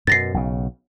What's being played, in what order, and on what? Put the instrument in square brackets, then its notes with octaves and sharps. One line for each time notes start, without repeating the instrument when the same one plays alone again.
[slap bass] F#2 B2 [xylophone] A6 A#6 C7
[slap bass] B1 C#3